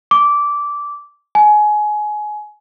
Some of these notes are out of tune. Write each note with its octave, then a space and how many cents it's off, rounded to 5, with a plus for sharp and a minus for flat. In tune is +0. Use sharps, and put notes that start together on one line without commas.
D6 -15
G#5 +25